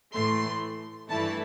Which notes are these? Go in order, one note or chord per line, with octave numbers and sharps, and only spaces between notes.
A2 E3 A3 C6
G2 E3 A3 E4 A5